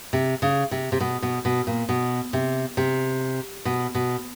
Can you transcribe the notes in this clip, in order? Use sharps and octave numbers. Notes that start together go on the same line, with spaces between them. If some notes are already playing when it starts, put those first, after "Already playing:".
C3
C#3
C3
C3
B2
B2
B2
A#2
B2
C3
C3
B2
B2